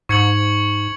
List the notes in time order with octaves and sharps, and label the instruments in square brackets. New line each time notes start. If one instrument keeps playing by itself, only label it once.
[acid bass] G#2 [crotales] C#6 G#6 C#7 F#7